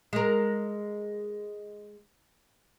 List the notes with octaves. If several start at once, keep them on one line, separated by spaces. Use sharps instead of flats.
G#3 A#4